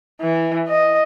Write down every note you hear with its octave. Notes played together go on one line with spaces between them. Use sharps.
E3
D#5